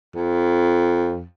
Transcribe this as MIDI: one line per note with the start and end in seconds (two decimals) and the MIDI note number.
0.16 1.25 41